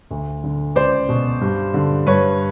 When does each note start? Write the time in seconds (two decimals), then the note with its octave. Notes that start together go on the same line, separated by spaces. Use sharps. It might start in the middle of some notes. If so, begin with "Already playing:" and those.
0.11 D2
0.44 D3
0.76 C#2 C5 D5
1.09 B2
1.41 G2
1.74 D3
2.06 G2 B4 C#5